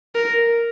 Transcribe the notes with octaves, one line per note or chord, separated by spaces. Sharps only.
A#4